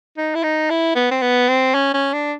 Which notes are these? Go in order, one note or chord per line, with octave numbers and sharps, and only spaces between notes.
D#4
E4
D#4
E4
B3
C4
B3
C4
C#4
C#4
D4